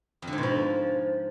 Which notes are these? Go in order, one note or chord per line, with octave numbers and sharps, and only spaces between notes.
F2
D3
G#2
B2
F3